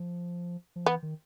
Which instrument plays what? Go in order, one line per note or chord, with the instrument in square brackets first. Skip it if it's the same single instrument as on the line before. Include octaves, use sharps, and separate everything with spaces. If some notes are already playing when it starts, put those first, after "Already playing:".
Already playing: [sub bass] F3
F3
[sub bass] E3 [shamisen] B3
[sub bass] D#3